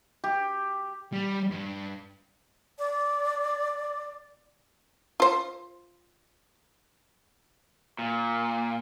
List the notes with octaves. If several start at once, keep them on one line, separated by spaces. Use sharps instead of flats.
G4
G3
G2
D5
F4 C5
A#2